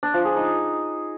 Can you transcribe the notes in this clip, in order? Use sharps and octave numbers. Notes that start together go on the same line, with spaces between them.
D4
F3
G#4
D#4